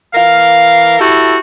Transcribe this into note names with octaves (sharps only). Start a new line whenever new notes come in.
E3 A#4 F5
E4 F#4 G4 A4